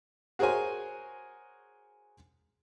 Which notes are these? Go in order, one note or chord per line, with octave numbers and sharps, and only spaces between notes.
F#4 G#4 A#4 C5 C#5 G#5